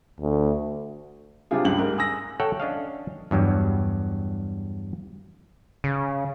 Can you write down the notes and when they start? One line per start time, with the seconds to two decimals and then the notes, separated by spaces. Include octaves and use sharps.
0.20 D2
1.51 C3 G3 D4 F4 G#4
1.65 C#2 G2 F#7
1.78 G#2 A#4
1.98 G#5 D#6 E6 A#6
2.40 A4 C#5 E5 F#5 G5
2.60 C#4 D4 D#5 F5
3.31 E2 G2 F#3 G3
5.84 C#3